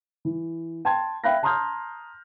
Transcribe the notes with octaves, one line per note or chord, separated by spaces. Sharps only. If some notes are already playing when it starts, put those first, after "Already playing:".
E3
G5 A5 C6 G#6
E5 F5 G5 B5 F#6 A#6
A5 A#5 C6 D#6 F6 G6